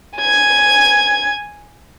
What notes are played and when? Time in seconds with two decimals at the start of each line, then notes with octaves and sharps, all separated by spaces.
0.18 G#5 G#6